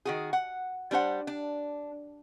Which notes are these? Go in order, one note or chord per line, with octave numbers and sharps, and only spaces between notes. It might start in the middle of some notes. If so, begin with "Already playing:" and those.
D#3 F#4 G#4
F#5
G3 D4 C5 F#5
D4